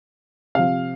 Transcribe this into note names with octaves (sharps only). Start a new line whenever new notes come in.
C3 F3 F5